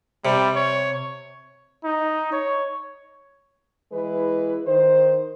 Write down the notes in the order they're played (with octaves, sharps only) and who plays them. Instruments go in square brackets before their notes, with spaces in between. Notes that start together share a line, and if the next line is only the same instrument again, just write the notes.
[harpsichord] C3 [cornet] G3
[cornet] C#5
[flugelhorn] D#4
C#5
[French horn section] E3 G#3 E4 B4
D#3 C5